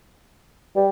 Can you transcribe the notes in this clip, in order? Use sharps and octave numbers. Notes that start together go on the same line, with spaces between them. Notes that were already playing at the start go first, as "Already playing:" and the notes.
G3